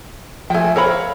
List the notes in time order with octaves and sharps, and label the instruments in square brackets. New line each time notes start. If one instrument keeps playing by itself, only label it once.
[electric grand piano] F3 G#5 [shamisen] A3 G5
[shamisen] A4 C5 B5 [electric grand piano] A#4 C#5 F5